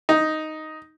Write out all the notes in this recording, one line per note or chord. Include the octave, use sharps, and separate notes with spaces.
D#4